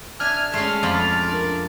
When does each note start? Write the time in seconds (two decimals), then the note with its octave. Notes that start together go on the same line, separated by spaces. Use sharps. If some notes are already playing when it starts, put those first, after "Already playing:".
0.20 D4 E5 G#5 F6
0.53 G#3 A3 C#4 C6
0.83 F2 F4 D5 B5
1.29 D4 A#4